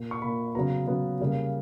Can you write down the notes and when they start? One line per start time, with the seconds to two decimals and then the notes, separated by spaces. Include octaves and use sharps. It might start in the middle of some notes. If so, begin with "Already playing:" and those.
Already playing: A#2 A#3
0.11 C#6
0.22 A#2 A#3 B5
0.55 C#3 F#3 B3 A#5
0.87 C#3 F#3 B3
1.20 C#3 G3 A#3